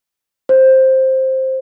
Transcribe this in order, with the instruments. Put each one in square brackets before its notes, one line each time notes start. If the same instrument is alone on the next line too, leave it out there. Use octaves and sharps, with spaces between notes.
[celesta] C5